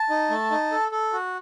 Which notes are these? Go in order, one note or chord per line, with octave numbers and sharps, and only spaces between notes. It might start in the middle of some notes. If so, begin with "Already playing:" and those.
Already playing: A5
D#4
A3
D#4
A4
A4
F#4